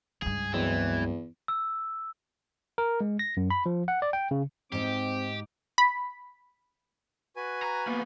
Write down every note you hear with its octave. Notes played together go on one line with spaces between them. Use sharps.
C#2 G2 G#4
E2 E3 F#3 G#3 C4
E6
A#4
G#3
A#6
F#2
B5
F3
F#5
D5
G5
C#3
G#2 C4 D#4 G4 D6
B5
F#4 B4 G#5
A#5
A#3 B3